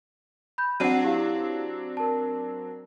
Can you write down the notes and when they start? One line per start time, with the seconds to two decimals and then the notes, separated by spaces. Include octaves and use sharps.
0.58 B5 G6
0.80 F#3 C4 D4 F#5 C7 D#7
1.03 E4 G4 F5
1.97 A#4 A5